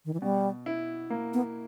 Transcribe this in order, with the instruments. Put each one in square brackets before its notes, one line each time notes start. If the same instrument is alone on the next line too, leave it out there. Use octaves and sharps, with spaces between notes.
[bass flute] D#3
E3
[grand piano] B2 [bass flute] G3
[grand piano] E4
A#3
[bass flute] B3